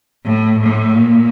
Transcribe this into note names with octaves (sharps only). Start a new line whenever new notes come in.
A2
A2
A#2